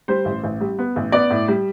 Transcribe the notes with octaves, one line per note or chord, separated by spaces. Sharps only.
G3 C5
A1
A1
G3
B3
A1
B3 D5
A2
G3